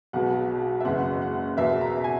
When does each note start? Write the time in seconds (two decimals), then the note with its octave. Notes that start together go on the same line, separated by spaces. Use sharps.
0.13 B1 B2 G#3 F#5
0.80 E5
0.85 F#1 F#2 E3 G#3 F#5
1.22 F#5
1.57 E2 B2 A#3 E5
1.81 A#5
2.04 G#5